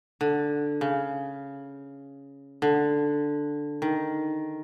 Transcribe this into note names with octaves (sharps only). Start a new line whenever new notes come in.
D3
C#3
D3
D#3